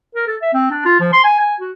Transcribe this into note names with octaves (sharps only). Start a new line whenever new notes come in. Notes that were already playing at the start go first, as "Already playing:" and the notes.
A#4
A4
E5
C4
D4
F4
F3
C6
G#5
G#5
F#4